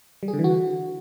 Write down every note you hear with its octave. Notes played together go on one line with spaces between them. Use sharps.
G3
G#4
D3
E3
F#4